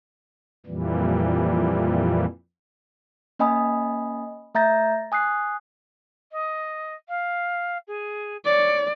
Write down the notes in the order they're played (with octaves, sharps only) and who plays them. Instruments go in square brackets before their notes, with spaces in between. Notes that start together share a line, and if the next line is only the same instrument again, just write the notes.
[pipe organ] F2 A#2 E3 G3
[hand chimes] A#3 C#4 D#5 G#5 B5 D#6
A3 E5 A#5 G6 A6 A#6
G#5 D#6 F#6 C7
[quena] D#5
F5
G#4
[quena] C#5 [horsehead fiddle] D5